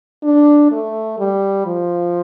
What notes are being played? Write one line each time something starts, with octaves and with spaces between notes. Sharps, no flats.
D4
A3
G3
F3